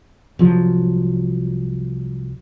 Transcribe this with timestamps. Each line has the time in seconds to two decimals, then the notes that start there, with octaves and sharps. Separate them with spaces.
0.39 C2 F3 F#3